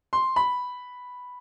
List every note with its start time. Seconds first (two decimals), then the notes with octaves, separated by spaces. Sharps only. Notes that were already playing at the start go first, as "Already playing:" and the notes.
0.13 C6
0.36 B5